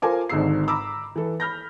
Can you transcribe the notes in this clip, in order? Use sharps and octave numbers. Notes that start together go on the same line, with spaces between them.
F4 A4 A#4 C5 G#5 D6
G#1 G#2 D3 D#4 E6 C7
A#5 B5 D6 E6
E3 A4
B5 F6 G6 A#6